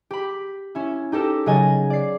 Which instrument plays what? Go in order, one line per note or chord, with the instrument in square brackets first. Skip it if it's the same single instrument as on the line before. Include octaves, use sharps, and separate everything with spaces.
[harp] G4 B5
C#4 E4
D#4 G4 A4 A#4
C#3 F#3 D#5 G#5 A6
D5 C7